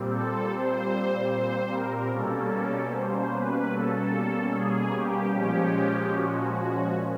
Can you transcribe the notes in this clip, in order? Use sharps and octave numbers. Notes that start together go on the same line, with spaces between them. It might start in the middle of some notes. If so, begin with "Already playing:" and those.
Already playing: A#2 G3 C4
A4
C5
C5
A#4
B2 G3 A#3 C#4 A4
C5
B4
A4
G#4
G4
A#2 F3 G#3 C#4 G4
F#4
F#4